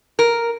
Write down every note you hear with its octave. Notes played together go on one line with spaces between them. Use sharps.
A#4